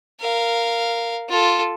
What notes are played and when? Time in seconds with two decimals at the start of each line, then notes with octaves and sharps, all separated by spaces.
0.20 A#4 F5
1.29 F4 A4